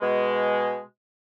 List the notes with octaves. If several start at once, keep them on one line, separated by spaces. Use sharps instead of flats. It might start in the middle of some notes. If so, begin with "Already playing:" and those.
B2 G#3